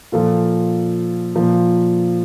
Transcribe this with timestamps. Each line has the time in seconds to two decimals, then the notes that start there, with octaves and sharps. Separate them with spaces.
0.12 A#2 F3 F4 A4
1.36 A#2 F3